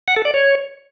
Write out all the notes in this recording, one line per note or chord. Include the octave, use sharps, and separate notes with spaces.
F#5
A4
D5
C#5